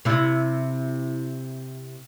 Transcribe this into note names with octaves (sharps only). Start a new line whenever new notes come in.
C3 E4